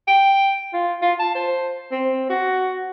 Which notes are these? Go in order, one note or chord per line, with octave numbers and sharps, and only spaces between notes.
G5
F4
F4
A5
C5
C4
F#4